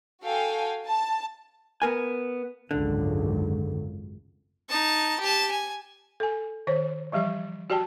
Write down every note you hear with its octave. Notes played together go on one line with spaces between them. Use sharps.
F#4 A4 F5 G5 G#5
A5
B3 A#4 G#5
G#1 C#2 F#2 D3
D#4 A5
G4 A5
G#5
A4 G#5
D#3 C5 C#5
E3 F3 G3 G4 D5
F#4 G4 D5 G5 A5